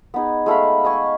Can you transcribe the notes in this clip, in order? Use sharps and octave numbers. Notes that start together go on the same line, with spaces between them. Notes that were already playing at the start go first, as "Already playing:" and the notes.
B3 D#4 G#4
G#3 A3 F5 B5
D#5 G#5 C#6